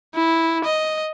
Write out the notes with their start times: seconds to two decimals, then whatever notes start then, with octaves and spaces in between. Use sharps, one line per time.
0.15 E4
0.65 D#5